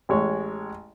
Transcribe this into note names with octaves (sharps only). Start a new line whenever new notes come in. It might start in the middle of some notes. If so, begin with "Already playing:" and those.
A1 G#3 C#5